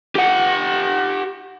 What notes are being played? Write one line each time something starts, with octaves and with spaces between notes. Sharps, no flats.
G4 F#5